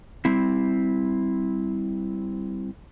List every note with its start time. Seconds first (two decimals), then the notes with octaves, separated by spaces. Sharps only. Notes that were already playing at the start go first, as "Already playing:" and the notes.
0.25 G3 C4 E4